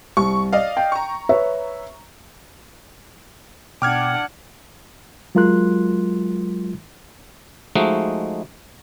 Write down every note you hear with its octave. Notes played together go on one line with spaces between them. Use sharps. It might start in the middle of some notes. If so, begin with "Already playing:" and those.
C2 C#6
D5 D#5 F5
G5
A#5 C#6
B4 C#5 E5
B2 D4 F#5 G5 D6 F6 G#6
F#3 G#3 F4 A#4 C6 F#6
F3 G#3 A3 D#4 F#4